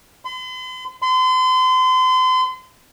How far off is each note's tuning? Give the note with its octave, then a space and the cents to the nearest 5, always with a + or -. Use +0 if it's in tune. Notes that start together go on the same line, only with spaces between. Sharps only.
C6 -45
C6 -35